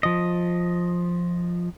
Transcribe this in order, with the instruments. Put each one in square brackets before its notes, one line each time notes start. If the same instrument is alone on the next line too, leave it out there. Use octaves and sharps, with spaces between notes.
[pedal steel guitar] F3 D#5